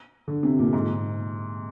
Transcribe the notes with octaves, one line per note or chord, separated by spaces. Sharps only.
D3
C3
A#2
G#2